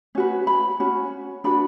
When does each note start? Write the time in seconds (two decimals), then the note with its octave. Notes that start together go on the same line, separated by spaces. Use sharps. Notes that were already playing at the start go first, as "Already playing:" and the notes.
0.15 C#4 F#4 B4
0.47 B5
0.80 C#4 F#4
1.44 D4 F#4 B4 B5